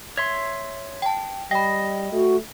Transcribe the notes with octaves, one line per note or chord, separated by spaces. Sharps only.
C#5 E5 C6 G#6
G5 A5
G3 D#5 G5 B5
A3 F#4